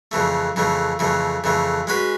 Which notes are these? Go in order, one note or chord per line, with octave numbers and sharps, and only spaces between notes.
F2 C#3 E3 A3
F2 C#3 E3 A3
F2 C#3 E3 A3
F2 C#3 E3 A3
G#3 C#4 F#4 B4